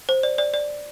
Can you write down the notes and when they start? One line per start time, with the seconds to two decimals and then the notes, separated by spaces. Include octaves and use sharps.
0.09 C5
0.23 D5
0.38 D5
0.54 D5